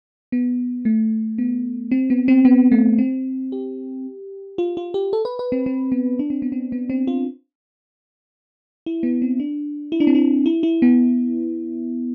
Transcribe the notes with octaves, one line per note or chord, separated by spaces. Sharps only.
B3
A3
B3
C4
B3
C4
B3
A3
C4
G4
F4
F4
G4
A4
B4
B4
C4
C4
B3
D4
C4
B3
C4
B3
C4
F4
E4
B3
C4
D4
E4
D4
C4
D4
E4
E4
B3